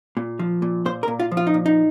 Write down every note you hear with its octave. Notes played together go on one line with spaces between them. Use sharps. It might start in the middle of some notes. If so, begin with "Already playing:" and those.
A#2
F3
A#2
A#2 C5
A#4
A#2
F4
F3
F4
D#4
A#2
D#4